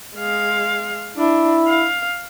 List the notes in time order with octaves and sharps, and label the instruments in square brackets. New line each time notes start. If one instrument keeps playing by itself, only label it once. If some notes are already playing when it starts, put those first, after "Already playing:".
[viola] G#3 F5
[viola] D4 [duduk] E4
[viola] F5